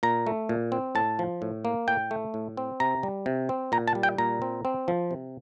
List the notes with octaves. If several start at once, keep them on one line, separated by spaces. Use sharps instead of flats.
A#2 A#5
A3
A#2
C4
A2 A5
F3
A2
A#3
A2 G5
A3
A2
C4
C3 A#5
G3
C3
C4
A#2 A#5
A5
G3
G5
A#2 A#5
C4
C4
F3
C3